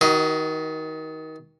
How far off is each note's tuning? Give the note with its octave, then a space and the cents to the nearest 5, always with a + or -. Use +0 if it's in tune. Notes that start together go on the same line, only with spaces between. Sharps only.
D#3 +25 F#4 +40 D#5 +0